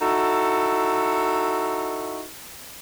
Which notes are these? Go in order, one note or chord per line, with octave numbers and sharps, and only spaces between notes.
D#4 E4 F#4 A4